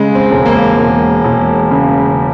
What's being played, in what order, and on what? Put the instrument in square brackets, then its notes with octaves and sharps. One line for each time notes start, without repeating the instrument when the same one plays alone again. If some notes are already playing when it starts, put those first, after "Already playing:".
Already playing: [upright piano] C#3 [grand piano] G#3
[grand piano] C4
[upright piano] E1
[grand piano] A#3
[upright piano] E1
E1
C#3